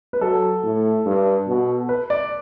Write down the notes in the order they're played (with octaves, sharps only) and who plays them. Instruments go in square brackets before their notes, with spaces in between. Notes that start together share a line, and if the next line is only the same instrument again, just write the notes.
[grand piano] B4
[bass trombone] F#3 [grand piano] A4
[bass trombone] A2
G2
B2
[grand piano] B4
D5